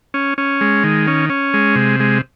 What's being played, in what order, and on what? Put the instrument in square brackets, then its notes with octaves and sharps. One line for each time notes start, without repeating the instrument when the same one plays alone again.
[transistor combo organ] C#4
C#4
G#3
D#3
C#4
C#4
G#3
C3
G#3